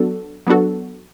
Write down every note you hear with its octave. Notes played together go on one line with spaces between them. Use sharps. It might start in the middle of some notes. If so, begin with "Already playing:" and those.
Already playing: F#3 B3 D4 F#4 A4
F#3 B3 D4 F#4 A4